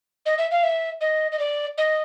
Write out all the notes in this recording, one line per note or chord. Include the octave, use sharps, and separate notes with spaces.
D#5
E5
F5
E5
D#5
D#5
D5
D#5